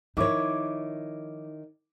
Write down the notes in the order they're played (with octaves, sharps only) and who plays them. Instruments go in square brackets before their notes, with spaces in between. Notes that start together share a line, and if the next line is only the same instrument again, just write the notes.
[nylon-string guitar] D#3 E4 C#5 [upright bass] F3 D#4 [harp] D6 E6